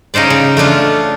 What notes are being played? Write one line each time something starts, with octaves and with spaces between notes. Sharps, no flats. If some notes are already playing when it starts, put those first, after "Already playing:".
C#3 C#4 D#4 C5 D5
C#3
A3 C#4 D4 F4